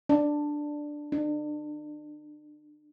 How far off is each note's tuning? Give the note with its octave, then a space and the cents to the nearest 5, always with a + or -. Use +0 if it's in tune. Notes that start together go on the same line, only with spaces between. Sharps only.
D4 +5
D4 +35